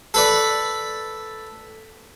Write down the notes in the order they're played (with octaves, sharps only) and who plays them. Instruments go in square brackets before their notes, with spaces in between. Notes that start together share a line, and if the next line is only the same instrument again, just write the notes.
[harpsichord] A4 B4 D5